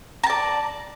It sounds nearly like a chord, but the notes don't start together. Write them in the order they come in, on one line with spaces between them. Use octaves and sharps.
A#5 A5 D5